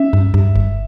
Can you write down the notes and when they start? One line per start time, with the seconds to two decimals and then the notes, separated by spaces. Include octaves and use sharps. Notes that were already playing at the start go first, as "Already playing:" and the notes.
Already playing: C#4 E5
0.13 G2
0.34 G2
0.56 G1